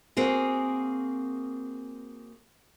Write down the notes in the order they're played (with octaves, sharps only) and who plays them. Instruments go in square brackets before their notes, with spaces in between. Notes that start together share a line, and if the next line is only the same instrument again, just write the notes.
[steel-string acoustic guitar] A#3 C4 F#4 G#4